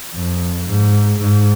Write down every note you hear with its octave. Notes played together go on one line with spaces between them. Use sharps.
F2
G#2
G#2